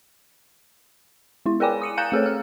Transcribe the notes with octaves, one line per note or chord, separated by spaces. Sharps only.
G#3 E4
G#4 A#4 D5 G5 G#5 D6
D#6 C#7 D#7
F5 A#5 F#6 G6 C#7 E7
A3 G#4 A4 C#5
F6